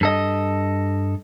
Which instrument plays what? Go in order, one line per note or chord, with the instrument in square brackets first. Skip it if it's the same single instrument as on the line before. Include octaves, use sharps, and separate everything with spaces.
[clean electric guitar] G2 A4 D#5